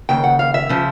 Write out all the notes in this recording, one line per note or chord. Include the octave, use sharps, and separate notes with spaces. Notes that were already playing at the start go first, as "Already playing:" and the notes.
D#2 C#3 G5
F#5
F5
E5
C#3 F3